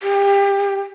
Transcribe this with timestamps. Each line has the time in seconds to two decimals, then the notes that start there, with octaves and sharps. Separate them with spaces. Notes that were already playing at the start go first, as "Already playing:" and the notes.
0.02 G4